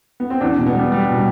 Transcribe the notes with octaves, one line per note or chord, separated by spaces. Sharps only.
B3
C4
E2 D4
B2
B3
G3
G3
B2